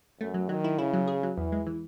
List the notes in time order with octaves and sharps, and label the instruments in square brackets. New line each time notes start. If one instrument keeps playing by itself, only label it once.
[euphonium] F#2 [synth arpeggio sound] A3
[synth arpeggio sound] F#3
[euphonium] D#3 [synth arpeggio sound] F#3
[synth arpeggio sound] E4
[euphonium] C#3 [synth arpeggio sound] E4
[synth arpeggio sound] F#3
G#4
F#3
[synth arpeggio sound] E2 [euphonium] E3
[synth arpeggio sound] G#3
E3